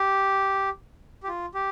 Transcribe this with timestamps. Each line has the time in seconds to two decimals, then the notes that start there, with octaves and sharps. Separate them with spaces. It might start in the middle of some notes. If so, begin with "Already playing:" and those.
Already playing: G4
1.23 G4
1.28 F4
1.54 G4